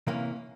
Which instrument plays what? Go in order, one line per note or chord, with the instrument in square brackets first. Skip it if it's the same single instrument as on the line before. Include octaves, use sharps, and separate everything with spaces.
[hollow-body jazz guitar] C3 E3 A#3 C#4 F5